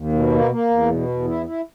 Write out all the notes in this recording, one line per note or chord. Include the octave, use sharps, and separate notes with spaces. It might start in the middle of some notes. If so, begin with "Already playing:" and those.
Already playing: D#2
B2
A#3
A#3
E2
B2
E2
E4
E4